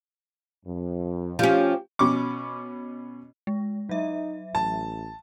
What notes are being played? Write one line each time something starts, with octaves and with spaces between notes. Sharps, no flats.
F2
F3 C#4 F4 G4
B2 C#4 C#6 D6
G#3
F#3 D#4 E5
A1 A5